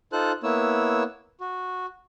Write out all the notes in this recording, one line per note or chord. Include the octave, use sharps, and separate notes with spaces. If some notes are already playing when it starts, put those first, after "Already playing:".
D#4 F4 A4 C5 F#6
A#3 B3 E4 C#5 E6
F#4